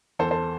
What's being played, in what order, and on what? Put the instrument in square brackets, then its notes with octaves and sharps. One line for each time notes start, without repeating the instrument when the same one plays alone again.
[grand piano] E2 A4 C5
A4 C5